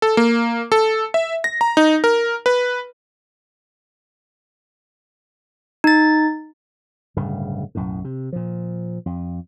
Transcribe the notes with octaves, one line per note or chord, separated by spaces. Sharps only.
A4
A#3
A4
E5
A#6
A#5
D#4
A#4
B4
D#4 A6
D1 G2 C#3
B1 F#2 A2
C3
A#2 F3
F2